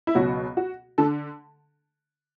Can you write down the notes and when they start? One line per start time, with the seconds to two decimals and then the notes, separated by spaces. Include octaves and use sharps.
0.07 E4
0.15 C#2 B2 F#3 F#4
0.57 F#4
0.98 D3 A4